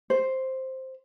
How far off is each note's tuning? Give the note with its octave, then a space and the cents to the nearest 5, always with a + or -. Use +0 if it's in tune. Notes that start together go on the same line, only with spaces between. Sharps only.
C5 +5